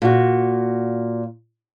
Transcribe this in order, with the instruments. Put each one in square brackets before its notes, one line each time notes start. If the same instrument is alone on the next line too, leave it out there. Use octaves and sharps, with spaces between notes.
[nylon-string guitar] A#2 F#4